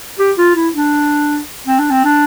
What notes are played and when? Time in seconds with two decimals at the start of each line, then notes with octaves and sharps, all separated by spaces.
0.19 G4
0.38 F4
0.55 E4
0.75 D4
1.67 C4
1.79 D4
1.91 C4
2.04 D4